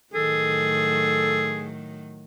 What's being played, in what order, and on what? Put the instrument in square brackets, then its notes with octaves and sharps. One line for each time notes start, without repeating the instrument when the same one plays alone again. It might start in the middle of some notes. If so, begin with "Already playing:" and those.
[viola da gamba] A2 D#3 F#3 [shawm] G#4 [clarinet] A4